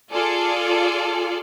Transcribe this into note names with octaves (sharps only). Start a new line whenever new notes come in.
F4 G#4 A4 D5